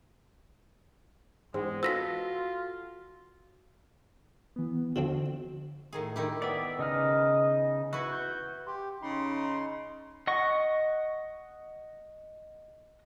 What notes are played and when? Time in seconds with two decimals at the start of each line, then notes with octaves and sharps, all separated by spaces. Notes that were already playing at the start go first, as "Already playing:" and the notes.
1.54 E2 G#2 G#3 C4
1.83 F4 F#4 A4 B4 E6 A#6 B6
4.56 E3 B3
4.96 D3 F3 C4 F#4
5.93 A2 D#3 G#4
6.16 D#3 E4 G4
6.42 B3 D5 E5
6.79 C#3 D#4 D#5 F6
7.93 E4 F#4 B4 C#6
8.12 G6
8.67 G4 C6
9.02 C#3 D#4 B5 C6
10.27 D#5 F#5 C#6